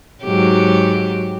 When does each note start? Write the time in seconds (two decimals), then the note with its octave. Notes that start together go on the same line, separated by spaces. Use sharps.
0.24 G#2 F#3 G4